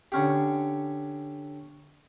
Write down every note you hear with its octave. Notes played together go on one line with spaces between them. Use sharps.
D3 C#4 G4